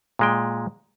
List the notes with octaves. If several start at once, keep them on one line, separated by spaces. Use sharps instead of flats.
A#2 G#3 G5